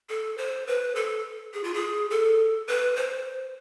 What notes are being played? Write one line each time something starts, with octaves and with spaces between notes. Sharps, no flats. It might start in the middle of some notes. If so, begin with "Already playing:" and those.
A4
C5
B4
A4
G#4
F4
G#4
A4
B4
C5